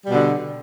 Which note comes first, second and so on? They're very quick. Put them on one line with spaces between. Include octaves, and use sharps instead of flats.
G3 B2 D3